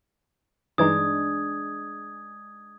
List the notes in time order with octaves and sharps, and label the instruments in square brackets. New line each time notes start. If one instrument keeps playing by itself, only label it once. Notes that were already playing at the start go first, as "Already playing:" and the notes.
[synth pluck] G2 E3 D#4 [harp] G#3 D4 [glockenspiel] D#6 G#6